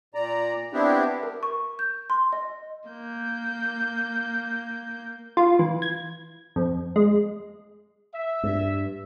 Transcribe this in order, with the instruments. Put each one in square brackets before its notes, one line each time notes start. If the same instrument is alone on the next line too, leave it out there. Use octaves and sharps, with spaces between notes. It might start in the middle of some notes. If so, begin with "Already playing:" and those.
[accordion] A#2 D5 A#5
B3 C4 D4 E4 G4
[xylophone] A#4
C#6
G6
C6
D#5
[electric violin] A#3 G6
[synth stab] F4
E3
G#6
F2
G#3
[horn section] E5
[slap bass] G2